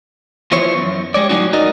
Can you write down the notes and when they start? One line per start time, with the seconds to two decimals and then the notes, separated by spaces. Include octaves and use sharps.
0.51 E3 F3 B3 E4 C5 C#5
0.78 F#2
1.14 G3 G#3 C#5 D5
1.29 A2 F#3 C4 C#4 D#4 F#4
1.53 D#4 F#4 A#4 D5 D#5